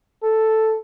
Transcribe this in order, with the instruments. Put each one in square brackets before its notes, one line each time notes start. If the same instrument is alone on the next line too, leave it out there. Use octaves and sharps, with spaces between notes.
[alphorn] A4